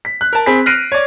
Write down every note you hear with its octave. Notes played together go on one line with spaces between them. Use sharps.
B6
F#6
A#4 A5
C4 G#4 B5 B6
F6 F#6 A#6 C7 D7 D#7
C#5 D5